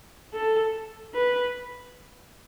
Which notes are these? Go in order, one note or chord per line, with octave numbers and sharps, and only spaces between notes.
A4
B4